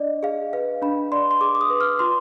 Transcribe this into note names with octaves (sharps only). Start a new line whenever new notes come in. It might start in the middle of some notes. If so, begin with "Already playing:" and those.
Already playing: D4 D5 D#5
G#4 F5
B4 F5
D4 B5
D5 C6
C6
G#4 D6
D6
D#6
B4
F6
F4 C6